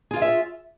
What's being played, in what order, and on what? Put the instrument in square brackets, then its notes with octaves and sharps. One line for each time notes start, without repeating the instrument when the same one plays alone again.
[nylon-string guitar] G#4
F4
F5
C#5
E5